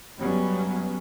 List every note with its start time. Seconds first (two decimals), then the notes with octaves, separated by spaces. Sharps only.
0.18 F#1 F#2 F#3 G3 B3 C#4